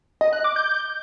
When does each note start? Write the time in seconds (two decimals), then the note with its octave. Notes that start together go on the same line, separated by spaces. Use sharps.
0.21 D#5
0.33 F#6
0.44 D6
0.56 G6